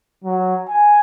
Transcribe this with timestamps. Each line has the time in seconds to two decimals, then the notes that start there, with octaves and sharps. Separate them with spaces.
0.24 F#3
0.68 G#5